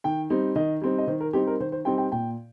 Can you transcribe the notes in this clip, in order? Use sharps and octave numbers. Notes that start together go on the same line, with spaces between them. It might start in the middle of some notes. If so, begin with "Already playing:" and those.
D#3 G5
G3 C4 D#4
D#3 D#5
G3 C4 D#4
D#5
D#3 C5
A#4
G3 C4 D#4 G4
A#4
D#3 C5
C5
G3 C4 D#4 G5
G5
A#2 G5